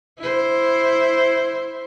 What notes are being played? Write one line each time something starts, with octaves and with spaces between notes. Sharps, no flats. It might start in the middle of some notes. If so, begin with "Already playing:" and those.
E4 C5